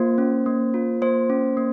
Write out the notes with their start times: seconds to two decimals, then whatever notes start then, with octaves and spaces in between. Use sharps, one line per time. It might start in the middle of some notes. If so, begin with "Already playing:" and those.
Already playing: A#3 F4 C5
0.18 C#4
0.46 A#3
0.74 F4
1.02 A#3 C5
1.30 C#4
1.57 A#3